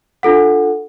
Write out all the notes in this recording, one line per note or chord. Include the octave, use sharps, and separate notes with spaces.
D4 F4 A4 F#5